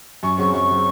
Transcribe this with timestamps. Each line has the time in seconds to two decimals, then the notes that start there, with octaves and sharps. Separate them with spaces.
0.23 F#2 C#6
0.38 C#3 F#3 C4 C#6
0.53 F#2 C#6
0.70 C#3 F#3 C4